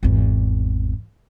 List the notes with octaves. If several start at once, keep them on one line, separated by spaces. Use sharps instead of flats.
G#1 E2